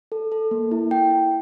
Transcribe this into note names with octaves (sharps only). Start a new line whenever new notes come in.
A4
A4
A#3
E4
E4 G5
E4